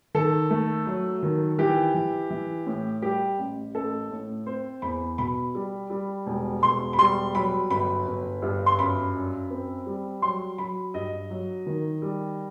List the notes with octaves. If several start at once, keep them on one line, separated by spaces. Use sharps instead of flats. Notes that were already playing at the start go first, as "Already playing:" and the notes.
D#3 A4
A3
F#3
D#3
E3 G4
E3
E3
A2
G3 G4
A1
A1 A4
A2
C4 C5
E2 B5
B2 B5
G3
G3
E1
E1 C6
B5
G3 C6
F#3 B5
G1 B5
G1
G2
C6
F#2 B5
F#2
C4
G3
F#3 C6
F#3 B5
G2 D#5
F#3
D#3
G3